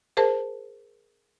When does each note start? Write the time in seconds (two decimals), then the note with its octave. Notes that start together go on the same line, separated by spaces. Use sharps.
0.17 G#4 A#4 C5 A5